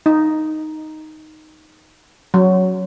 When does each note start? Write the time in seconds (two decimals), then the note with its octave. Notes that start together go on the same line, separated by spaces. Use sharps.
0.06 D#4
2.34 F#3